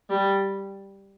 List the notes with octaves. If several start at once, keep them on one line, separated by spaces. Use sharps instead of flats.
G3